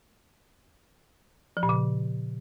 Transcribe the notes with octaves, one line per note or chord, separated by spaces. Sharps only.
F3
A#2
C#3